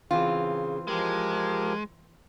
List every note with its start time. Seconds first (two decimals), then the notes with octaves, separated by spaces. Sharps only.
0.11 C#3 E3 C4 F4
0.88 F3 G#3 G4 A#4